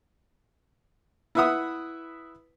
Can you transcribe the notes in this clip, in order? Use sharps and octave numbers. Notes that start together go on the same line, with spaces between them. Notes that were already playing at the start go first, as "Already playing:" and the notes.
E4 B4 E5 F#5 D#6